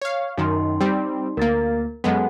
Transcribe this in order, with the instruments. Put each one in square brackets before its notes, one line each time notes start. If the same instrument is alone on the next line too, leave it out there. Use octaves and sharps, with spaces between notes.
[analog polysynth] C#5 F5
[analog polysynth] F#2 D#3 [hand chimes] D#4 C6
[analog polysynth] G3 C4
[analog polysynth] D2 A#3 [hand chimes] A#4 A6
[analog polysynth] F#2 G#3 B3 [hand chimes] A4 F#5